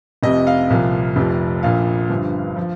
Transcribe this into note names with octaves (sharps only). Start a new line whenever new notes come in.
F1 F2 C3 D#5
F5
C2 A#2 F3
F1 F2 C3 F3
A#1 A#2 F3 F5
G1 G2 F3
F3